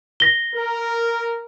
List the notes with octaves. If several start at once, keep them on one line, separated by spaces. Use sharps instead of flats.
A#6 G7
A#4